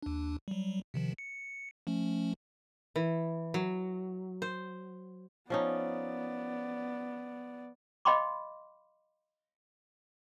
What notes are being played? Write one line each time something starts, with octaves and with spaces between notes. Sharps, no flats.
D#2 D4
F#3 G3
C3 D#3 F3
C#7
F3 A3 C#4
E3
F#3
C5
F3 B3 C#4 D#4 D5
D#5 F5 G5 B5 C6 D6